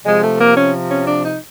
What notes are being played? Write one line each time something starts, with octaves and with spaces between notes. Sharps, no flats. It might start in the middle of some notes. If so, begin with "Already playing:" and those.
C3 F3 G#3
A3
A#3
C#4
C#4
D4
D#4